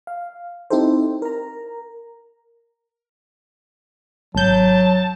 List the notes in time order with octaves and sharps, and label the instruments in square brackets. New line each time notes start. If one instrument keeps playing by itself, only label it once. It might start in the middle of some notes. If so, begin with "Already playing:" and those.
[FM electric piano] F5
C4 D#4 E4 G4 A4 C5
A#4 A#5
[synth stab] G#1 G6 [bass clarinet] F#3 [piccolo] A5